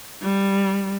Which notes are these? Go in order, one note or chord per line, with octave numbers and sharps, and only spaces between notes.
G3